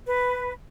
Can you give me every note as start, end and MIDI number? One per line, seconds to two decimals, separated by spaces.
0.07 0.52 71